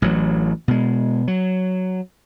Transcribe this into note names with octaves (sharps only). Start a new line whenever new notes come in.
A1 E3 F#3
B2 G#3
F#3